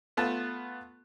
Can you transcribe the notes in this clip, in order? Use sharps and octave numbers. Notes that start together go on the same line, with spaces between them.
A3 B3 F4 A5